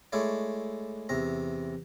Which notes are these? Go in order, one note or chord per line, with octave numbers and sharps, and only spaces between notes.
G#3 A3 E4 C#5 D5
E2 C3 A#5